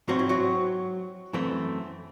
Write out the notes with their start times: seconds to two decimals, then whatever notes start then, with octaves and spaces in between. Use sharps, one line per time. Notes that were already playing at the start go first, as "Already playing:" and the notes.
0.08 G#2 F#3 C4 F#4
0.19 E4
0.29 F#3 F#4
1.33 F#2 E3 A3 C4